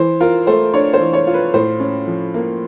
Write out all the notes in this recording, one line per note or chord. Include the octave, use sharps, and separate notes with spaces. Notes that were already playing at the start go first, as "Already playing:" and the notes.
Already playing: E3 C5
F4 A#4
A3 C5
D4 C#5
C5
E3
C#5
F4
B4
A2 C5
C#4
F3
A#3